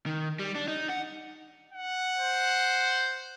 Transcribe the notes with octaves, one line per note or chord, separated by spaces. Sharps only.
D#3
G3
D4
D#4
F#5
F#5
C5